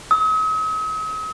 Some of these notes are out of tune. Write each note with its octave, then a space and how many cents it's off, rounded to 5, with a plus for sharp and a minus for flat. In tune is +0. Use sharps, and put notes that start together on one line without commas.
D#6 +45